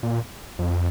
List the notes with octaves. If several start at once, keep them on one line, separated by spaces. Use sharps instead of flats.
A#2
F2